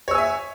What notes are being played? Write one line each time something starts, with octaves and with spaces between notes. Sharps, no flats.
C#5 E5 G#5 E6